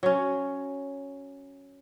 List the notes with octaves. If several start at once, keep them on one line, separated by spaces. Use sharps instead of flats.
F#3 C#4